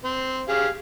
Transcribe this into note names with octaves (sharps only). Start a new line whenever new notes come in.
C4
G4 G#4 F5